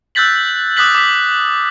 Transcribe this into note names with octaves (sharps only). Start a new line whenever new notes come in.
E6 F#6 G6 A6 B6 F#7
D6 D#6 F#6 B6 F#7
D6 B6